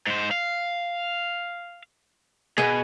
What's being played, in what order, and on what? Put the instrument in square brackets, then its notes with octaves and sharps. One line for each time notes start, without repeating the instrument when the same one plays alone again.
[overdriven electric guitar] G#2 C5
F5
[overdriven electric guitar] B2 [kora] B3 G#4